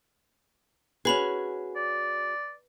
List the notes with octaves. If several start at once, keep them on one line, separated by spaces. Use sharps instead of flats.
C#4 F#4 G#4 B4 B5 F7
D5